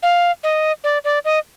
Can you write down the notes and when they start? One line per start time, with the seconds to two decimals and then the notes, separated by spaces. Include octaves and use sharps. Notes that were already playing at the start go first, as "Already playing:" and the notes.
0.03 F5
0.43 D#5
0.84 D5
1.04 D5
1.25 D#5